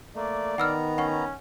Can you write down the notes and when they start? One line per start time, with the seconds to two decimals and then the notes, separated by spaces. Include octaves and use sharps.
0.16 A3 A#3 D5
0.58 D#3 B3 F#5 A#5 E6 F6
0.98 C#4 F#5 C#6